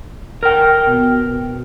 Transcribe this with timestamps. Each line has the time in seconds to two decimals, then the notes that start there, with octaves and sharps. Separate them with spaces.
0.43 A#4 G5
0.88 B2